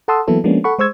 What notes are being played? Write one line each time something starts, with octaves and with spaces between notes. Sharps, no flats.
A4 F#5 A5 C6 D#6 E6
E3 F#3 A#3 B3 E4 A4
F3 G#3 A#3 B3 C#4 D4
A4 F#5 B5 C#6
G#3 C5 C#6 E6 G#6